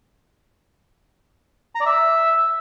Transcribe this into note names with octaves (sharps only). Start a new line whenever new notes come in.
A#5
D5
E5